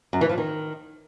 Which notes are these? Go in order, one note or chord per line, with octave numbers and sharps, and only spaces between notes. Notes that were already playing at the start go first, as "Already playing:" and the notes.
F#2
E3
F3
D#3